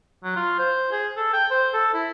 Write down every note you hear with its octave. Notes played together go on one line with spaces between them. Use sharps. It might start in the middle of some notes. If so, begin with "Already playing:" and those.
F#3
F4
C5
G#4
A4
G5
C5
A4
E4